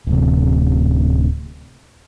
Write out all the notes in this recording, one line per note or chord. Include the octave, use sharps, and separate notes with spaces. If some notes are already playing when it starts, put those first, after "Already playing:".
D1 C3